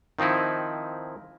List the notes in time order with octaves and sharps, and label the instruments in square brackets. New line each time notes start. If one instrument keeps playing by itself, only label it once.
[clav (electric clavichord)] D#3 F3 C4 D#4 E4